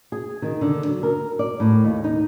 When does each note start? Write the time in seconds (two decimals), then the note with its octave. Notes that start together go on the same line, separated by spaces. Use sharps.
0.12 G#4
0.42 D#3
0.61 D3
0.86 F#3
1.03 A#4
1.39 D5
1.60 A2
1.84 D#2
2.04 D#4